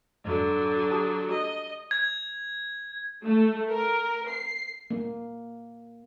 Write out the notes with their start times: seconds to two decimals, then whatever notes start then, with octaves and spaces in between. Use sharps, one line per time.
0.25 F2 G#2 D3 F#3
0.91 G4 A5 D#6
1.31 D#5
1.91 G#6
3.25 A3
3.71 A#4
4.29 C7
4.91 A#3